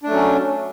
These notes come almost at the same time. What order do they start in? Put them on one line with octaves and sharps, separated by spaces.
D4 A3 F#3 C#4